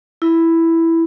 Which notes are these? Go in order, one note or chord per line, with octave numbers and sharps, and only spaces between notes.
E4